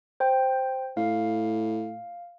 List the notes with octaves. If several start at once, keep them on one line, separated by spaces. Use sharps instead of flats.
C5 G5
A2 F5